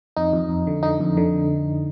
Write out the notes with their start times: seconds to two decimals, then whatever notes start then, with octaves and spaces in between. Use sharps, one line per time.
0.16 F2 D#4
0.33 F2
0.49 F2
0.67 D3
0.83 D3 D#4
1.00 F2
1.17 D3